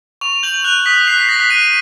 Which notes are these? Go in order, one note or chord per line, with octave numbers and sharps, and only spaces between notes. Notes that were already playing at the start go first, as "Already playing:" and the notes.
C#6 F7
F7
G6 F#7
F#7
F#6 F7
D#6 B6
F#6 C7
B6
D#6 A#6
B6
F#6 D#7